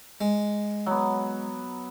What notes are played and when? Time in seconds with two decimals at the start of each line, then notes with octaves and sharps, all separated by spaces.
0.21 G#3
0.86 F#3 B3